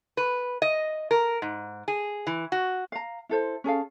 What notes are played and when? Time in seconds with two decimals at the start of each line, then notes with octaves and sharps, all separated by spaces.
0.17 B4
0.62 D#5
1.11 A#4
1.42 G#2
1.88 G#4
2.27 E3
2.52 F#4
2.92 F5 A#5
3.29 E4 A4 C5
3.64 C#4 G#4 A4 F5